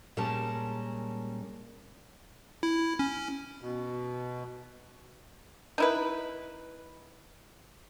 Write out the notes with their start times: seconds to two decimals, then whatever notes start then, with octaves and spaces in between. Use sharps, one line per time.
0.17 A#2 G3 G#3 C#4 A#4 A5
2.63 E4
2.99 C#4
3.62 B2
5.78 D#4 E4 B4